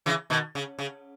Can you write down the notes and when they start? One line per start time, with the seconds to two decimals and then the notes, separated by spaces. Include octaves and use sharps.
0.06 C#3 E3
0.30 B2 D#3
0.55 C#3
0.79 C#3